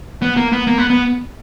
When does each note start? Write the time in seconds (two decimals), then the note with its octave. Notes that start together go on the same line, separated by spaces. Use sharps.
0.22 B3
0.37 A#3
0.52 B3
0.67 A#3
0.78 B3
0.90 B3